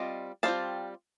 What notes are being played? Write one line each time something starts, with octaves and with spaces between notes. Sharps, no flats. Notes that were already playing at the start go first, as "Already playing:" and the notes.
Already playing: G3 C4 F4 D#5
G3 C4 F4 F5 A5